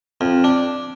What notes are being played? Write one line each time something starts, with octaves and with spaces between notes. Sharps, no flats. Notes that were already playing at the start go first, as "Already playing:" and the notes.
F2
D4